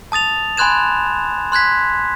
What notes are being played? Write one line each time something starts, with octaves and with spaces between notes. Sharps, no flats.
A5 D#6 A6 F7
G#5 B5 C6 F#6 G#6 E7
C6 F#6 G#6 B6